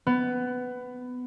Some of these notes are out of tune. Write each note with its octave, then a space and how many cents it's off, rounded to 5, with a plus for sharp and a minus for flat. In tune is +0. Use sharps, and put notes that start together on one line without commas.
B3 +15